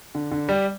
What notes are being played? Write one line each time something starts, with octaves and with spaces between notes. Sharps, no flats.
D3
D3
G3